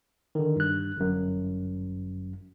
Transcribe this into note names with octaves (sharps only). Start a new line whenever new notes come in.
D3 D#3
G2 F#6
G1 F#2